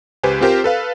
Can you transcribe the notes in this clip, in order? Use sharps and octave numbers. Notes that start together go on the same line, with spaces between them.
C#2 G4 B4 C5 G#5
C4 F4 G4 A#4 C5 G5
A4 B4 F5